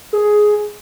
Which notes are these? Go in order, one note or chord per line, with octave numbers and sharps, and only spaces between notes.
G#4